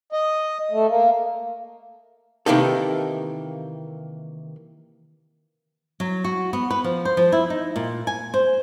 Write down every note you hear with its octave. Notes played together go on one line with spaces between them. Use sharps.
D#5
A3
A#3
C3 D#3 E3 A#3 D#4 A4
F#3
F#4
B3
B4
F3
C5
F3
E4
D#4
A#2
G#5
C5